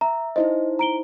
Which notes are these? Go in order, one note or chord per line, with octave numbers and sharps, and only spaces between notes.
E5 A#5
D#4 E4 C5 D#5
A#5 D7 G7